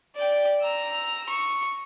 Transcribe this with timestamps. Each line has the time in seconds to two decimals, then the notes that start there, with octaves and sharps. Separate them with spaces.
0.16 D5 G5
0.62 A#5 E6
1.29 C#6